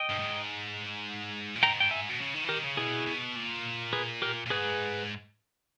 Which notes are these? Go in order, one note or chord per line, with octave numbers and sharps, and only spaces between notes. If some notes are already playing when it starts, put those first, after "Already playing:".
Already playing: D#5 G5
G2
G#2
A#2
G#2 G5 A#5
G5
E5 G#5
B2
C#3
D#3
E3
D#3 G4 A#4
C#3
B2 E4 G#4
B2
A#2
G#4 B4
G4 A#4
A#2
G#2 G#4 B4